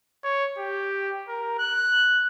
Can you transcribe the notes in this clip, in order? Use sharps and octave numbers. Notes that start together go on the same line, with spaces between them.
C#5
G4
A#4
F#6